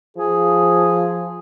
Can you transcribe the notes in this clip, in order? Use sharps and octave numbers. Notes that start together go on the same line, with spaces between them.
F3 G#4